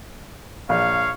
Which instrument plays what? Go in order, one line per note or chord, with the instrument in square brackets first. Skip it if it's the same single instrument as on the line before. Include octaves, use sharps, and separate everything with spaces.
[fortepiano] A#1 [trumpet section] C#5 F5